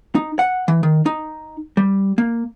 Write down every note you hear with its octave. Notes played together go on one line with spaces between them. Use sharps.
D#4
F#5
E3
D#3
D#4
G3
A#3